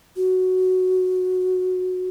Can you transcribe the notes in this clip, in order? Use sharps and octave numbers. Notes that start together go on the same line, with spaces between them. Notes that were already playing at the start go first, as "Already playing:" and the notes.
F#4